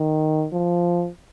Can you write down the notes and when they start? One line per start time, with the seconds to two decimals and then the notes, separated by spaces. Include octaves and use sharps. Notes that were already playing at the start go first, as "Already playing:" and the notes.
Already playing: D#3
0.53 F3